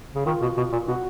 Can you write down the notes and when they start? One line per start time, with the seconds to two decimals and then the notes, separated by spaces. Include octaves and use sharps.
0.15 C#3
0.26 D#3 F4
0.42 B2
0.57 B2
0.72 A#2
0.88 B2 F#4